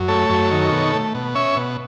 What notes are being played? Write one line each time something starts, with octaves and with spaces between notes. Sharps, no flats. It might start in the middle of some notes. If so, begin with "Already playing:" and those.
Already playing: F#2
A3 A4 C#5
F#2
D#3
B2
A3
B2
C#4 C#5 E5
B2